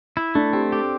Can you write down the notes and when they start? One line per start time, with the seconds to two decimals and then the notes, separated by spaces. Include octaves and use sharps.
0.17 E4
0.35 A3 D4
0.53 C4 G4
0.72 G4 A4